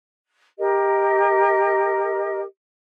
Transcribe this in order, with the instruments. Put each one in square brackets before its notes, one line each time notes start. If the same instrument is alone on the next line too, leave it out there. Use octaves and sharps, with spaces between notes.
[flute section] G4 A#4 D#5